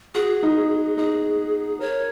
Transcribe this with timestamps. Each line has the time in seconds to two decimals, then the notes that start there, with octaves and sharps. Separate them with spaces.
0.15 F#4 G#4
0.43 D#4
0.97 D#4 G#4
1.80 A#4 C#5